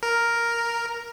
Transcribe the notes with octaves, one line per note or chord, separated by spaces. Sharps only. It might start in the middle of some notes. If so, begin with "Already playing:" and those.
A#4